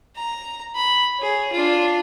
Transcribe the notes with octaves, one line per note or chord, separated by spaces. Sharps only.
A#5
B5
G#4 C#5
D4 F4